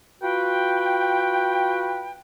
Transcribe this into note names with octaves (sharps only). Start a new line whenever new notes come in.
F4 F#4 B4 G5